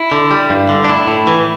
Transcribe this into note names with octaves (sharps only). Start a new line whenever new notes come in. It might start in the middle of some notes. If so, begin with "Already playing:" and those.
Already playing: E4
D3
G3
G2
D3
D4
A2 E4
A2
E3